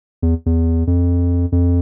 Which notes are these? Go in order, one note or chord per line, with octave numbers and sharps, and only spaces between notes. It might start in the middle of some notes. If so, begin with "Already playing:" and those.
E2
E2
F2
F2